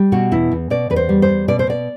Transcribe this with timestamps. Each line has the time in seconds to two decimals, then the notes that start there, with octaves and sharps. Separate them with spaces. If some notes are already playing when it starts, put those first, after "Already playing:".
Already playing: G3
0.12 B2 F#4
0.32 E2 E4
0.52 E2
0.70 B2 D5
0.90 E2 B4
0.96 C5
1.09 G3
1.22 C5
1.29 E2
1.48 B2 D5
1.59 C5
1.67 B2 D5